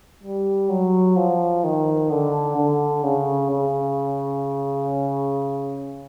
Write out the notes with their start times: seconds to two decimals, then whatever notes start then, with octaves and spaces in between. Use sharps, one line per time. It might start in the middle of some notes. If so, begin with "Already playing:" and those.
0.23 G3
0.69 F#3
1.16 F3
1.64 D#3
2.10 D3
2.57 D3
3.03 C#3
3.51 C#3